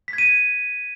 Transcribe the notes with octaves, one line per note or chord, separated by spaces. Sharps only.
B6
G#6
D#7